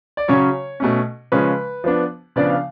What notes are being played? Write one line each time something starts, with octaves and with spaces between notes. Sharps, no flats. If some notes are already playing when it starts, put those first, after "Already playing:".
D5
C#3 F#3 C#4 C#5
B2 A3 C#4
C#3 F3 G#3 C#4 B4
F3 B3 D4
C#3 F3 B3 D4 D5
F5